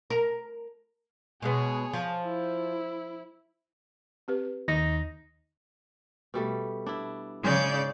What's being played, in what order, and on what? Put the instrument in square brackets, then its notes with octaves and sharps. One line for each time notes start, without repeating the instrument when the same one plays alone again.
[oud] A#4
[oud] B2 G#3 B3 [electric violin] G#4 C#5
[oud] F3
[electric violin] E4
[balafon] C4 G4 B4
[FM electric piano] D#2 [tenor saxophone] D#4 [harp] A#6
[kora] B2 G3 A3
D4 E4
[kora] G#2 G#3 G#4 [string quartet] C#3 D5 G6